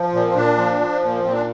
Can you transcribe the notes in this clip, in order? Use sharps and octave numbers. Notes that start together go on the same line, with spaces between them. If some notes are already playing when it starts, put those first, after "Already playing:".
Already playing: F3
A#2
C4
A#2 D4
F3
F3
A#2
A#2 C4
D4